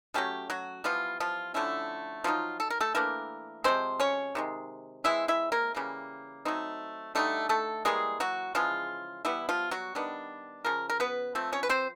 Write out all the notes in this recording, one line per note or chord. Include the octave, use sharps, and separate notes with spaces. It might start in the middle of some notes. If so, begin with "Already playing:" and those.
F#3 G3 A3 C#4 G4
F#3 F#4
E3 F3 G3 B3 F4
F3 F4
D3 F3 A3 C#4 E4
F3 F#3 A#3 D#4 F4
A4
A#4
A3 A4
E3 A3 A#3 D4 A#4
C3 F3 G#3 C4 C5
C#4 C#5
C3 D#3 G#3
E3 G#3 C4 E4 E5
E4 E5
A#3 A#4
C#3 E3 G3 A#3
F#3 A3 C4 D#4
D3 G3 A3 C4 D#4 A4
A3 A4
E3 G3 G#3 A#3 G#4
F#3 F#4
C#3 E3 F3 G#3 F4
E3 G3 B3 E4
F3 F4
F#3 F#4
D#3 G3 B3 D4
C#3 F3 A#4
A#4
B3 B4
F3 A3 C4
C#4 C#5
B4
C4 C5